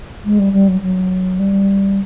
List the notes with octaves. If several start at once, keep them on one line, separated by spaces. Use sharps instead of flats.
G#3
G3
G3
F#3
F#3
G3